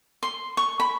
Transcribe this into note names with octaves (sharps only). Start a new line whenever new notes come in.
C6
C#6
B5